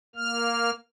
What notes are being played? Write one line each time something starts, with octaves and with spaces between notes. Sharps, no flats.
A#3 F6